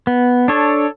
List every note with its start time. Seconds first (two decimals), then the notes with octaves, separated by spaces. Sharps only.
0.07 B3
0.48 D4 A4 C#5